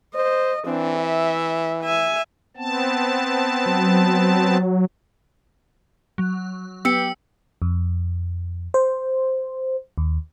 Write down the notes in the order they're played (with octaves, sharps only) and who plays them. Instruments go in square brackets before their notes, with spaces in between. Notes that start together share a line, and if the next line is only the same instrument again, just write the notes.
[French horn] C5 [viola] D#5
[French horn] E3 [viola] C4 D4
[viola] E5
E5 G#5
[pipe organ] B3 C4 A5
[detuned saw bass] F#3
[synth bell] F#3
[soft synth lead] B3 [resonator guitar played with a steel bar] G4 [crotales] E6 C#7
[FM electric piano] F2
C5
D#2